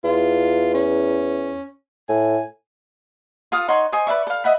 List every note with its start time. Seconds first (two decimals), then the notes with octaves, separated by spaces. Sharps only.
0.04 E2 F4
0.74 C#4
2.09 A2 G#5
3.52 F4 A4 F5 D#6
3.68 D#4 C#5 F#5 C6
3.92 C5 D#5 G#5 C#6
4.07 B4 D5 E5 C#6
4.27 A4 F5
4.44 D#5 E5 F#5 B5